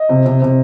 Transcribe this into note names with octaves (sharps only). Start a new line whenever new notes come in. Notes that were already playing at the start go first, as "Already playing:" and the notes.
Already playing: D#5
C3
C3
C3